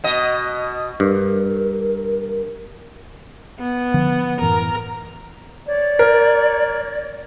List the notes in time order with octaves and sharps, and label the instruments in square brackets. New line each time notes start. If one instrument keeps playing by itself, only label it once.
[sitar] B2 D#5
[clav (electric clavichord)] G2 [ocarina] A#4
[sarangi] B3
[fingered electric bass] D3 F3
[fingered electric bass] F#2 A2 E3 [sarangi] A#4
[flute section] C#5 D5
[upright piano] A#4